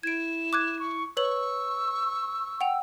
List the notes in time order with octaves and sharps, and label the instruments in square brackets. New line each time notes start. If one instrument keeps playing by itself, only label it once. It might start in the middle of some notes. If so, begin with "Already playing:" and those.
[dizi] E4 [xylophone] G#6 D7 [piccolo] E7
[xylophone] D6 F#6 G#6
[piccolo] C#6
[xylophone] B4 C#5 F#7 [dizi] C#6 [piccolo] E6
[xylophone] F#5 G5 F7